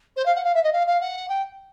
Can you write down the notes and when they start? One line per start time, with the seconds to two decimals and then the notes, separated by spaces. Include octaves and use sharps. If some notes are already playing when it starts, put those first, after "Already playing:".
0.16 C5
0.25 F5
0.36 F#5
0.44 F5
0.54 E5
0.63 D#5
0.73 F5
0.87 F5
1.01 F#5
1.29 G5